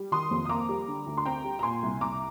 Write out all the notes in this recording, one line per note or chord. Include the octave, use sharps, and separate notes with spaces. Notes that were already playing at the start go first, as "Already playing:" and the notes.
Already playing: G3
D#3 C6 D#6
F2
D#6
A#3 A#5 D6
G3
D3
D2
C6
C4 G5 A#5
G3
A#5
A#2 G#5 C6
C2
C2 A#5 D6